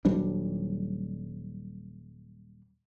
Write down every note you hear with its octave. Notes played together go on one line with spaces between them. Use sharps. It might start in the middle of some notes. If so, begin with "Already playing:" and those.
D#1 F#3 G3 D4